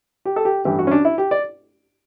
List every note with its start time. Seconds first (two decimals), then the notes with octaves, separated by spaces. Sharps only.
0.25 G4
0.36 A4
0.45 G4
0.65 A1 G2 E3 G4
0.79 F#4
0.87 C#4
0.91 D4
1.05 E4
1.18 G4
1.31 D5